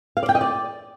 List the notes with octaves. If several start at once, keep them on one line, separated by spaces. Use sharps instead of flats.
F5
D5
G5
D#5
D5